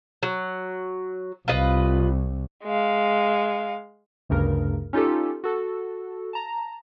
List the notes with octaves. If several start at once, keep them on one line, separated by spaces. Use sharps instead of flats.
F#3
C2 F4 B4 D#5
G#3 F5
G1 D2 G2 C#3 A#4
C#4 D#4 F4 G4 A4
F#4 A4
A5 A#5